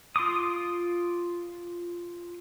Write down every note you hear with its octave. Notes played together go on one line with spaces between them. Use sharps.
F4 C6 D6 D#6